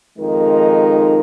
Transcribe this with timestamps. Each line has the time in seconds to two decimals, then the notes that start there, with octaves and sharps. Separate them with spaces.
0.17 F2 D#3 G#3 D#4 A#4